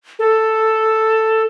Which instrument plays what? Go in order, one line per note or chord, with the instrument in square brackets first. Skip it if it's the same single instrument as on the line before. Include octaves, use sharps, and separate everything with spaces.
[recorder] A4